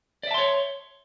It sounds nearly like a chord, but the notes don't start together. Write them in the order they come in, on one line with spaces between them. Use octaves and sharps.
D5 E5 A5 C6 C#5